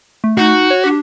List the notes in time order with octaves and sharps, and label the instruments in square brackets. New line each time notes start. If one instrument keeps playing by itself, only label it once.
[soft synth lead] A3
[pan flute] D#4 [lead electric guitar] F#4
[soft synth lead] C#5
[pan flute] D4 [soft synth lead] G4